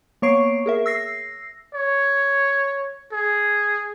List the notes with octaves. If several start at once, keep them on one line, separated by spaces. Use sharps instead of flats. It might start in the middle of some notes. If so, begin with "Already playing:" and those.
A#3 B3 C#5 C#6 C7 D7
G#4 A#4 E5
E6 A#6 C7
C#5
G#4